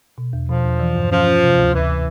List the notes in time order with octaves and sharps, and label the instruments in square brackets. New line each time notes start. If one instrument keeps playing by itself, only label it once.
[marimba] B2
E2
[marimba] B2 [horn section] F3
[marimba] E2
E3
G2
[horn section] F3 [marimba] C#4
[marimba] C#4
C3
D2
[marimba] D2 [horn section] E3